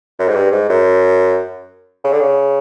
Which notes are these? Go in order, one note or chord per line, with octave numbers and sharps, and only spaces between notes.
F#2
G#2
G2
G#2
F#2
C#3
D3
C#3